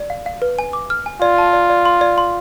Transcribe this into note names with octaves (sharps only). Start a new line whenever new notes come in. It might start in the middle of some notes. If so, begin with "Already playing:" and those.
Already playing: D5
F5
F5
B4
G#5
D6
F6
G#5
F4 D5
A5
D5
D5
C6
D5
C6